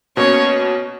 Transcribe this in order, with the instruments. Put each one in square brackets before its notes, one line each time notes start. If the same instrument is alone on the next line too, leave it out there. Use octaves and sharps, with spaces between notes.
[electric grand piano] B2 A#3 C#4 [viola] C#5